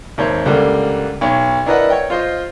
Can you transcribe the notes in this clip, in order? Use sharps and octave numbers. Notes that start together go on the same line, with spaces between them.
G#1 D#2 C5 C#5
C#2 D3 G3 A#3
B1 C#5
D4 E4 A#4 B4 D#5 F#5
C#5 G5
F4 C5 D#5